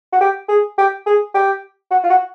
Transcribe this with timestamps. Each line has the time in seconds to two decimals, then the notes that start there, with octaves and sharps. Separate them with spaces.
0.13 F#4
0.21 G4
0.49 G#4
0.78 G4
1.06 G#4
1.34 G4
1.91 F#4
2.04 F4
2.10 F#4